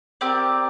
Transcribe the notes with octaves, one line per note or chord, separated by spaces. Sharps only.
C4 G4 A#4 D5